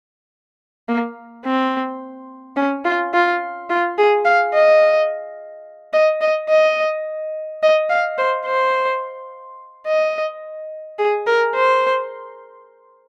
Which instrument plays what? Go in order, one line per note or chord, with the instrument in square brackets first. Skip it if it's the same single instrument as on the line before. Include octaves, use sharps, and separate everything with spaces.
[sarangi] A#3
C4
C#4
F4
F4
F4
G#4
F5
D#5
D#5
D#5
D#5
D#5
F5
C5
C5
D#5
G#4
A#4
C5